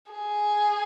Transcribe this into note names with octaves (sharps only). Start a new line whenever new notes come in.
G#4